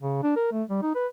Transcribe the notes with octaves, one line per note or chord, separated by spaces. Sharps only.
C#3
D4
A#4
A3
G3
D#4
B4